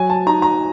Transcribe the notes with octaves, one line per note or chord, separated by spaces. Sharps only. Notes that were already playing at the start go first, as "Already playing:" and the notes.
Already playing: F#3 G#5
A5
D#4 A#5
A#5